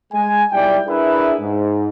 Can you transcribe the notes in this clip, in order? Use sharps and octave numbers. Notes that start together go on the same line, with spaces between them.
G#3 G#5
B1 G3 E4 D5 G5
D4 E4 G#4 A#4 B4 E5
G#2